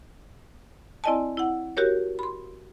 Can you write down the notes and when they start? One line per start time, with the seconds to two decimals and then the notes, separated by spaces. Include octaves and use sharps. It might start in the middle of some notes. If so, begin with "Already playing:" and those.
1.04 C4 E4 D5 D#5 G#5 A5
1.37 E4 F#5
1.77 F#4 G4 A#4 C#5
2.19 B5 C6